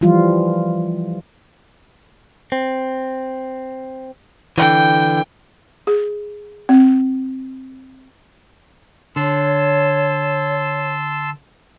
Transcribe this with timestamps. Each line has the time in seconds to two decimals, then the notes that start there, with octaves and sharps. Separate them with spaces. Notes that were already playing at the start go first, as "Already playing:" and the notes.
0.01 E3 F3 G3 F4
2.52 C4
4.58 D3 E3 G5
5.87 G#4
6.69 C4
9.16 D3 C#5 A5 C6 E6